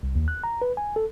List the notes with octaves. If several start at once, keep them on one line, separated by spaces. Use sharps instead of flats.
C2
D#2
F#6
A#5
B4
G#5
A4